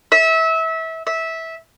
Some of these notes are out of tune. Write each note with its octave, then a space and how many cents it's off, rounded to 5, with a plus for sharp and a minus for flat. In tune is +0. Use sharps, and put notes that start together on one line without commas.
E5 -25
E5 -15